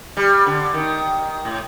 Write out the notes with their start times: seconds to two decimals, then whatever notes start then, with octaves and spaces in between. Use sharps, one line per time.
0.17 G3
0.46 D3
0.73 D#3
1.45 A2